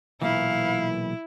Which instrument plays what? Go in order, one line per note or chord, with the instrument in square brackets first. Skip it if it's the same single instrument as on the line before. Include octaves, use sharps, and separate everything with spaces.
[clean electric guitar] B1 A#2 E3 [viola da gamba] E4 [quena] F5